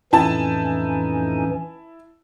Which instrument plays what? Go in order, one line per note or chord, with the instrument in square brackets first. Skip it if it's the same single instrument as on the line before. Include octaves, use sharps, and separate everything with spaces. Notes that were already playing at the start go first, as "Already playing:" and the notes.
[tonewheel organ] F2 A2 D#4 [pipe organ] E3 C#4 [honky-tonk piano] E4 A5